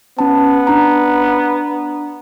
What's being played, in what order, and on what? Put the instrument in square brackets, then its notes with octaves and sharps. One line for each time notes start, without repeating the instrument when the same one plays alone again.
[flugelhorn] B3 [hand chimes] C#4 A5
[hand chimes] D4 A#5